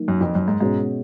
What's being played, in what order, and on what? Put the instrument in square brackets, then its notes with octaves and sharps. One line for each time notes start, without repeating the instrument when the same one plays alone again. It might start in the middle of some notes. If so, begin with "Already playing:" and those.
Already playing: [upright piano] D#3 F#3 A#3 D#4
[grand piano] F#2
F2
F#2
G#2
[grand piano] G#2 [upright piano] B2 G#3 C#4 F#4